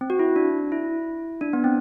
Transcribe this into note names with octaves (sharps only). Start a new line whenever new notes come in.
C4
F#4
E4
D4
E4
D4
B3
C4